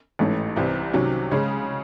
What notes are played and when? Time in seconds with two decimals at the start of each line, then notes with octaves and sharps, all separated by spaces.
0.19 A1 G#2 E3 A3 C#4
0.56 C2 C3 E3 C4 E4
0.93 C2 C3 D#3 F#3 C#4
1.31 C#3 G#3 C#4 G#4